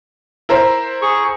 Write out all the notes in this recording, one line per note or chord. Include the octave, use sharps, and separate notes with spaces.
E4 A#4 C5
G#4 C#6